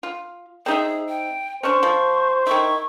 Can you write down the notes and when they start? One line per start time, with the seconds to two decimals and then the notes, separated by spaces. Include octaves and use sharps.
0.03 F4
0.66 C4 D#4 G#4 E5
1.09 G5
1.63 C#4 D4 C5 C#6
1.83 F3
2.47 D#3 E4 C#6